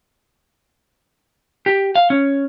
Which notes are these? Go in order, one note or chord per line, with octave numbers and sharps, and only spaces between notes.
G4
F5
C#4